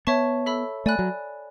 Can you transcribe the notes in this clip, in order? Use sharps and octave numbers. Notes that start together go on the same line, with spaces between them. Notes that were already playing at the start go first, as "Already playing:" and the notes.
B3 C#5 E5 A5 C#6
A4 E5 B5 E6
A3 D5 G#5 B5 F#6
F#3